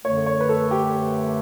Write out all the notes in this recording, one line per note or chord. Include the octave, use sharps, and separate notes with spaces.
F#2 D3 A3 C#5
C#5
B4
A4
G4